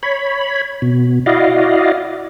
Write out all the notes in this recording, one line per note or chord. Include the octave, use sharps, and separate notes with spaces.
C#5 B5
B2
E4 F#4 D5 D#5 F5